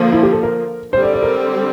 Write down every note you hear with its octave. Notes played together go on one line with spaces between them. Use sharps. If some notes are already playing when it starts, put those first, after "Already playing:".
Already playing: D3 F3 A#3
E4
G4
A4
A#4
D3 G3 C4 G4 C5
D5
D5
A#4